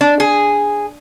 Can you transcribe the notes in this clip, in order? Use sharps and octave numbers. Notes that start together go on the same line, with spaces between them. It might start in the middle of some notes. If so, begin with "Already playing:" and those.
D4
G#4